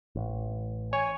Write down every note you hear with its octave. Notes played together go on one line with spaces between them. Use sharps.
A1
C#5 G#5